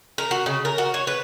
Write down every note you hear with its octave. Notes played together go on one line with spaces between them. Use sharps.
A#4
F#4
C#3
A#4
F#4
C#5
B4